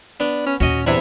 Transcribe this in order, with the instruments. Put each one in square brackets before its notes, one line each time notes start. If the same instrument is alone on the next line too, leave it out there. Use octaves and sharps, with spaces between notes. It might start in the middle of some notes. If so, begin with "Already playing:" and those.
[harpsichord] B3 [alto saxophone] D4
[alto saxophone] C#4
[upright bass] D#2 A#2 [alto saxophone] C#4 [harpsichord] F#4 D#5
[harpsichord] E2 C3 E4 [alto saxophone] D4